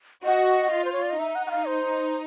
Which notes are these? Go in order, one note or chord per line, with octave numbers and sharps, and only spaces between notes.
F#4 D#5
F4
C5
C#5
D5
D#5
D#4 E5
F#5
F#5
F5
C5